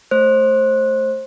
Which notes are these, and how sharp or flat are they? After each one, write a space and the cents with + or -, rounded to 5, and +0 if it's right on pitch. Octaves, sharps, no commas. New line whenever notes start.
A3 +0 C5 +25